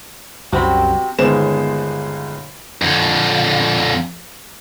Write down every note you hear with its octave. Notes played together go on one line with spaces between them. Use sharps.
C2 F#2 C3 F#4 C5 B5
G1 D#2 G#3 B3 C5 E7
F2 D3